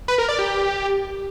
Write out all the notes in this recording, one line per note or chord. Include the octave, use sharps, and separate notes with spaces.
B4
A#4
D5
G4